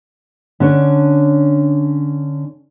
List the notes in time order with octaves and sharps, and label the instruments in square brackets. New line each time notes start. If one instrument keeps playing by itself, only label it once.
[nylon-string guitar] D3 C#4 D4 C#5